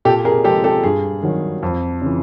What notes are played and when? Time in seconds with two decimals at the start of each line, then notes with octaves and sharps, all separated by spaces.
0.05 A#2 G4 A4
0.25 G#4 A#4
0.44 F3 G#3 G4 A4
0.64 G4 A4
0.83 G2 G#4
1.23 D#3 F#3
1.63 F2
2.02 C#3 E3